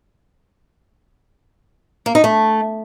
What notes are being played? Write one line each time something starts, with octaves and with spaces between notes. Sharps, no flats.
A#3
D#4
A3